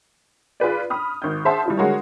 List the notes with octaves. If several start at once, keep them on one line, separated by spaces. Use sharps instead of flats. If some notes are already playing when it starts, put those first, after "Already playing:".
F4 G#4 B4 D5
B5 D#6 F6
G#1 G6
G#4 C5 E5 F#5 A5 C6
G3 E4 F4
D3 G#3 F#4 A#4 C#5